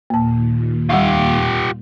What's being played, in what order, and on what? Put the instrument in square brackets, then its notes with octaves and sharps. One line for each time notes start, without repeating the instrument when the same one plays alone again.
[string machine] D#2 A#2 [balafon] A#3 A5
[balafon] G3 F#5 C#6 [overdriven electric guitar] F4 G4